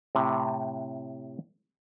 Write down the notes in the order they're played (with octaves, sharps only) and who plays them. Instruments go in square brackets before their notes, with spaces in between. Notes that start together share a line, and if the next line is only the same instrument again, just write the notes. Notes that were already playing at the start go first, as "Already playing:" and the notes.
[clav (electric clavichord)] A2 C3